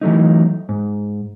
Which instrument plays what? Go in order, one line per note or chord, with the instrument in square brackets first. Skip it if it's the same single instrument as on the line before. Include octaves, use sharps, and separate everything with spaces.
[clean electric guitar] E3 F#3 A3 D#4
G#2